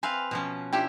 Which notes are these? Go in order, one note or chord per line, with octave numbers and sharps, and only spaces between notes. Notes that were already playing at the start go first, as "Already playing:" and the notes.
C4 B4 F5 G#5
B2 F3 C#4
D4 E4 F4 G4 E5 G5